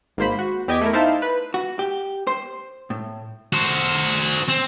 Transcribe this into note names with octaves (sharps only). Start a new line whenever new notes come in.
G#1 G#2 A#3 C5 B5
F#4
E2 G4 D#5 D6 G#6 B6
A3 E4 A#4
D#4 E4 C5 E5 F5 A5
B4
F#4
G4
C5
A2
F#4 C5
C4